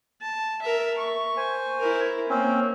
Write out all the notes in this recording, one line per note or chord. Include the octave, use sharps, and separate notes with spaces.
A5
A#4 E5
C#6
C5 G#5
E4 A#4
A#3 C4 C#4